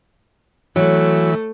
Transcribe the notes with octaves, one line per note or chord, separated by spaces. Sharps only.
E3 F#3 A3